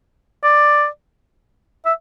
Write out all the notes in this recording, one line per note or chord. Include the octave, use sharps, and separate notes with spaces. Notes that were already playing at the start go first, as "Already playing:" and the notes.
D5
E5